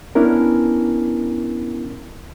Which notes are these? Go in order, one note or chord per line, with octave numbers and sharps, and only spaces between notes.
B3 C#4 D4 E4 A#4